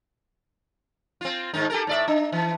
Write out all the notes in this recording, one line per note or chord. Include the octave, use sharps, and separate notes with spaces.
C4 F4
G#2 D#3 D#4
G4 A4 A#4
A2 D5 E5
D4
E3